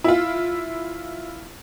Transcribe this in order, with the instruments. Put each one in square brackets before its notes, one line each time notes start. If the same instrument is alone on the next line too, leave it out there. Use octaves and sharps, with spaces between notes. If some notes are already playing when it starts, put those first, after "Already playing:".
[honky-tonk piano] E4 F4